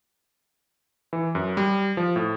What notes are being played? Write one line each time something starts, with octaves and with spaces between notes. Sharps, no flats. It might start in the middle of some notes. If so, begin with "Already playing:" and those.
E3
F#2
G3
F3
A2